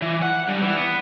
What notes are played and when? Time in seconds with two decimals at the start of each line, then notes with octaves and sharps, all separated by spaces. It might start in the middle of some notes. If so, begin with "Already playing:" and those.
0.02 E3
0.22 F#5
0.48 G2
0.61 E3
0.77 B3